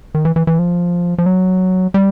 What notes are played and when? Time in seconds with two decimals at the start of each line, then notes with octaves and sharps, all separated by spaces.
0.15 D#3
0.25 E3
0.36 E3
0.47 E3
0.59 F3
1.18 F3
1.26 F#3
1.94 G3